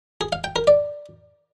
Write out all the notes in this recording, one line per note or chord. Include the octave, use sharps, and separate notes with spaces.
G#4
F5
G5
A#4
D5